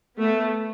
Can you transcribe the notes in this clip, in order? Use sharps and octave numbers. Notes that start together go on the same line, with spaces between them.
A3 B3